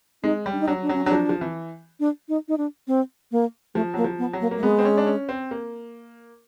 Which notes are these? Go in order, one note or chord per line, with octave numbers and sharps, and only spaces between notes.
G#3 D#4
G3
D4
D#4
F#3 D4
D4
F#3 C#4
F#3 D4
F3
F3
E3
D4
D#4
D#4
D4
C4
A#3
F3 A3
F#3 A#3
F3
B3
F#3
A#3
A#3
A3
G#3 B3
C4
C#4
D4
C#4
C4
A#3